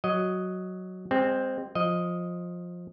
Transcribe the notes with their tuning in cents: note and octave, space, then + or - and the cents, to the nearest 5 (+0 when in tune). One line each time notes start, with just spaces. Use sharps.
F#3 +0 D#5 +0
G#3 -30 C4 +0
F3 +15 D#5 +0